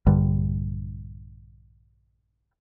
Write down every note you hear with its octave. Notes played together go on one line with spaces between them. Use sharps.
A#1 G2 D3 G3